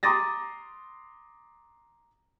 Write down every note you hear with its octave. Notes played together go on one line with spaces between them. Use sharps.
A#5 C6 D6 D#6 A6 A#6